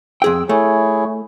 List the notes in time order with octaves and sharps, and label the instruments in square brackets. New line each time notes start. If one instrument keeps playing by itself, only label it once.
[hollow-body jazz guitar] F2 G#4 G5 [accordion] E6
[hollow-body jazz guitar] A3 [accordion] E4 G#4 C#5